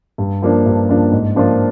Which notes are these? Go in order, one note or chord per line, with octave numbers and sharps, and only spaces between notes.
G2
F3 A#3 D4
G2
F3 A#3 D4
G#2
F3 A#3 D4 F4